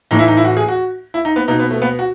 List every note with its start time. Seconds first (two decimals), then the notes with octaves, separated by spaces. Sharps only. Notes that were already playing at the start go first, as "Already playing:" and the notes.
0.11 A2 E3 D#4
0.19 E4
0.28 D#4
0.37 E4
0.45 F#4
0.57 G#4
0.68 F#4
1.14 E4
1.25 D#4
1.36 B3
1.48 B2 D#4
1.60 B3
1.71 A3
1.82 B3
1.99 F#4